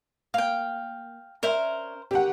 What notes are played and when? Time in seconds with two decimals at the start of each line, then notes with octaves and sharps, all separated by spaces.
0.34 A#3 F5 G5
1.43 C#4 A#4 C5 D5 E5
2.11 D3 D#3 G4 F#5